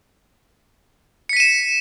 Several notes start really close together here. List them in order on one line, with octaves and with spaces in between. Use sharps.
C#7 B6 D#7 E7